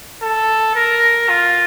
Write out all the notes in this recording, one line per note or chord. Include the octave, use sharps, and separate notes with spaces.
A4
A#4
F4